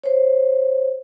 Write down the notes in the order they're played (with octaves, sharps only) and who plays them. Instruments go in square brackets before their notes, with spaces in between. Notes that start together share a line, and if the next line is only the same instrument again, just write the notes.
[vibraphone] C5 C#5